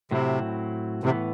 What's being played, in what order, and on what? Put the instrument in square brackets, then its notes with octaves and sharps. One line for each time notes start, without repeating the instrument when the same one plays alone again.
[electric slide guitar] A2 F#3 C4 E4 [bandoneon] C3
[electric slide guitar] A2 E3 B3 [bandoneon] C3